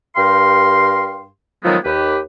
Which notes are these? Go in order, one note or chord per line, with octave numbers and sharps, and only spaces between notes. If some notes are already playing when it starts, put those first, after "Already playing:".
G2 G4 A#4 F5 C6
D#3 F3 F#3 G#3 A3 B3
D#2 G4 B4